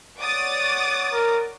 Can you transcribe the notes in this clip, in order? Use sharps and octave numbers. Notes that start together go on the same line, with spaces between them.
C#5 D5 F#5 D6 D#6 A6
A#4